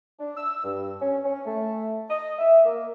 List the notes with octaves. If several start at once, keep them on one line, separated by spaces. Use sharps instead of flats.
D4
E6
G2
C#4
C#4
A3
D#5
E5
A#3